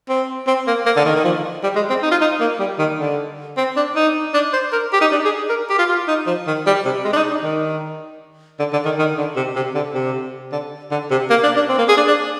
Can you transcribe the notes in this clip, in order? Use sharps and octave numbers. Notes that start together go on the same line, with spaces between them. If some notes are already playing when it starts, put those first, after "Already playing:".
C4
C4
A#3
A#3
D3
D#3
D#3
F3
G3
G#3
C4
D#4
F4
D#4
A#3
G3
D#3
D3
C4
D4
D#4
D4
C5
A#4
G4
D#4
D4
G#4
A#4
G4
F4
F4
D#4
F3
D#3
G3
C3
G#3
D4
D#4
D4
D#3
D3
D3
D#3
D#3
D3
C3
C3
D3
C3
D3
D3
C3
A#3
D4
D4
C4
A#3
G#4
D4
D4